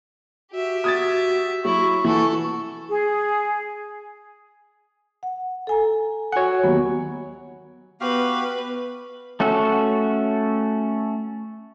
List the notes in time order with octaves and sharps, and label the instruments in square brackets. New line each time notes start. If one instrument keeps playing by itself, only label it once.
[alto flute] F#4 [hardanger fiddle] G4 E5
[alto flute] F#4 [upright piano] D#6 G#6 A6
[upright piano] F#3 [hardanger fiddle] E4 [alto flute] C#6
[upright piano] E3 [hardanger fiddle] F#4 A4
[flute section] G#4
[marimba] F#5
A4 G#5 A#5
[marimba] F#4 G#5 [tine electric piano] C#5 F#5
[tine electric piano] D#2 F#3 [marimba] B3
[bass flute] B3 [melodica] F#4 G4 F5 [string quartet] B4
[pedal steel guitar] A3 C#4 F#4 A4